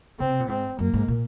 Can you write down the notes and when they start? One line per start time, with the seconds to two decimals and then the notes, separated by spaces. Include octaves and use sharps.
0.19 C#3 C4
0.29 C3
0.40 A#2
0.49 G#2 C4
0.79 F#2 A#3
0.93 G#2
1.08 A#2